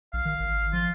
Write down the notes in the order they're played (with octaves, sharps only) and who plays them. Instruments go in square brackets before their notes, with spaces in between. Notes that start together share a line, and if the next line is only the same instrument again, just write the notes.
[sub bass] A#1 [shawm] F5
[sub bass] D#3
G#1
[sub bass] F3 [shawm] F4